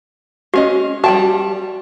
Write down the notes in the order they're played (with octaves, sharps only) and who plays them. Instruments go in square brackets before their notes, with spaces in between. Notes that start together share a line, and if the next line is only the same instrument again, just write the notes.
[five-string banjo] G#3 C#4 D#5 [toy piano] F#4
[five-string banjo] G3 G5 A5 [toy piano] F#4